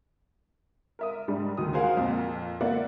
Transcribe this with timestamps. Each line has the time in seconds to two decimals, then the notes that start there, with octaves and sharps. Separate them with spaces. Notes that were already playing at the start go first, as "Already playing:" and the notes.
0.99 A#4 E5 D#6
1.28 G#2 G3 D4
1.57 D2 D#3 F#4 D#6
1.73 F#4 G#4 A#4 C5 F5 F#5
1.97 F2 A#2
2.61 A#3 B3 D5 E5 F#5